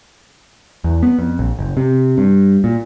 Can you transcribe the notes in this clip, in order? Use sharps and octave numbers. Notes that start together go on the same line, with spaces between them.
E2
B3
F2
A#1
F#1
C3
G2
A#2